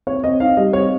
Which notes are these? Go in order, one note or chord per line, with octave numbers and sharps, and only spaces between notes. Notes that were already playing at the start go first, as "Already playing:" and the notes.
C4 C#5
C4 D#5
D#4 F5
G3 D#5
C4 C#5